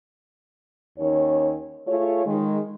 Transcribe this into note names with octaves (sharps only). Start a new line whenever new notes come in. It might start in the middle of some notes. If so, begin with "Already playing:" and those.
D#2 D#3 C#4 C#5
A3 F4 G#4 C#5
D#3 G#3